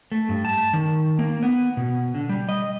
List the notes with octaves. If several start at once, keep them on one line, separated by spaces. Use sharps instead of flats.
A3
G2
A5
D#3
A#3
B3
B2
D3
G3
D#5